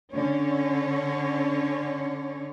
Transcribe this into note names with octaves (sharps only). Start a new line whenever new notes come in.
D3 C#4 C#5